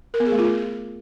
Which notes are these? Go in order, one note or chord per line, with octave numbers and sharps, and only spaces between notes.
A#4
B3
G#4
A3
F4